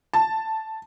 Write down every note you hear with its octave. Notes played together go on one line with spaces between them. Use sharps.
A5